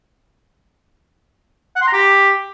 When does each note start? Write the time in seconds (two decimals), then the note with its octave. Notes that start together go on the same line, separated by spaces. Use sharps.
1.76 F#5
1.82 C6
1.87 A#5
1.93 G4